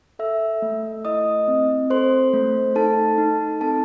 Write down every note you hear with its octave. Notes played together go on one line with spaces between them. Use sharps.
A4 E5 E6
A3
E4 D#5 D#6
C4
A4 C5 C6
A3
D#4 A4 A5
D#4
C4 A4 A5